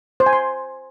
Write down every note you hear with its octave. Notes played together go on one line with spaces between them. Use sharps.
C5
G#5
C6